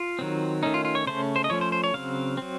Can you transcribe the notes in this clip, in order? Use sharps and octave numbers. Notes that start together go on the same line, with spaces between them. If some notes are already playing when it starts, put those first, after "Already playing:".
Already playing: F4
D#3 F#3 C4
D#3 A3 C#4 D#4
F4
F4
C#5
C#3 A3 C#4 C5
C5
D#5
F3 A3 C#4 C#5
C5
C5
C#5
C#3 F#3 C4 F5
F#3 C4